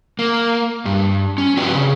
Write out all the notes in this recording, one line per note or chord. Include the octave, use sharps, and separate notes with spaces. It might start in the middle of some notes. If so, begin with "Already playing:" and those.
A#3
G2
C#4
C4 F#4 G4 B4 D5
C#3